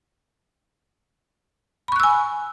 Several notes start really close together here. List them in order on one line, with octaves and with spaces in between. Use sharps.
B5 C#6 F#6 E6 G#5